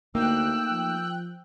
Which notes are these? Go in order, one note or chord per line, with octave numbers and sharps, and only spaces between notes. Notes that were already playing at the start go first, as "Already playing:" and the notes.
D2 A3 A#3 D#4 G5 E6 F#6
F3